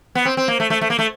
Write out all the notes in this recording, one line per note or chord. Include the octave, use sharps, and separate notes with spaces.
B3
C4
C4
A#3
A3
A3
A3
A#3
A3